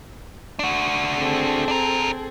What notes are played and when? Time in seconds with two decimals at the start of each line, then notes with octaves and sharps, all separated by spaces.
0.59 D4 F#4
1.16 C4 G#4 A4
1.68 D4 A#4